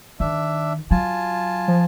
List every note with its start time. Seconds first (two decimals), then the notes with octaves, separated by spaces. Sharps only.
0.20 D#3 D4 E5
0.91 F#3 F4 G#5 A5
1.68 F3